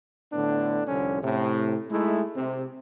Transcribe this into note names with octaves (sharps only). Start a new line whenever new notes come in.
A2 D3 B3 D4
C2 F2 D3 C#4
A2 C3
G#3 A3 D#4 E4
C3